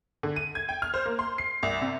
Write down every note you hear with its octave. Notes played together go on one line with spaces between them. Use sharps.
D3
D#7
G#6
G5
F6
C5
A#3
C6
C7
C2
C3